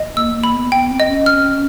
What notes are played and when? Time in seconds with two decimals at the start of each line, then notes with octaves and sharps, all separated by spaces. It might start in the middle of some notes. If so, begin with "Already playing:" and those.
Already playing: D#5
0.16 A#3 E6
0.35 A#3
0.44 B5
0.53 B3
0.72 B3 G5
0.90 C4
1.00 D#5
1.09 C#4
1.26 F6